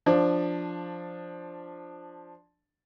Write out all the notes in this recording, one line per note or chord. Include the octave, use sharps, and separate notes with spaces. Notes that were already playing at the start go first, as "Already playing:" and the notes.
F3 D4